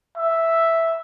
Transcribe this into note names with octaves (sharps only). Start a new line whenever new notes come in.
E5